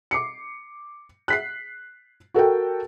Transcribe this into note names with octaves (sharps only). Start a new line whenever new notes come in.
D6 C7 C#7
F#6 B6 C7
F#4 A4 A#4 G5